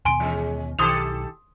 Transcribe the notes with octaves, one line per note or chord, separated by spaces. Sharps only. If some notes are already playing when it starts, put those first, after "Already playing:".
D#2 B2 B3 G#5 C6 D7
E3 G#3 C#4
B1 D#3 G4 A4 C6 D#6 F7